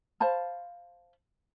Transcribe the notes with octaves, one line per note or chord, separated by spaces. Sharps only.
C5 F5 A5 B5